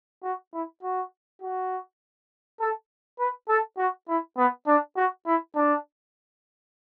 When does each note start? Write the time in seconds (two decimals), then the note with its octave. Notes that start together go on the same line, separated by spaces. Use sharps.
0.24 F#4
0.54 E4
0.83 F#4
1.42 F#4
2.60 A4
3.19 B4
3.49 A4
3.78 F#4
4.08 E4
4.38 B3
4.67 D4
4.96 F#4
5.26 E4
5.56 D4